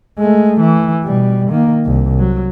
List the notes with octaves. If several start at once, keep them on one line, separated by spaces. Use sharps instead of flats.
G#3 A3
E3
B2 G3
D#3 A#3
C2
F#3